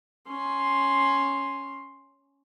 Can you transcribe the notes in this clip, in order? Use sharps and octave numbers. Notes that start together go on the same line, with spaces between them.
C#4 C6